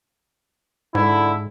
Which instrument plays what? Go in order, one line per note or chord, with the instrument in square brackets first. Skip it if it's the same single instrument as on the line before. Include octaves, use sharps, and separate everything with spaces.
[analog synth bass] G#2 [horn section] D3 E4